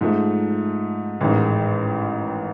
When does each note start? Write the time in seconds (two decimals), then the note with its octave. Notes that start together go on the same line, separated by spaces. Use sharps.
0.01 G#2 F3 A3
1.21 A1 G#2 D#3